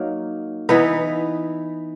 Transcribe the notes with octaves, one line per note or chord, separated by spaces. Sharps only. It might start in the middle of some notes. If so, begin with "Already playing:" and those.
Already playing: F#3 A#3 D#4
E3 B3 D#4